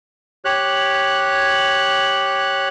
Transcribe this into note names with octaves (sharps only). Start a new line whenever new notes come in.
G4 C#5 F#6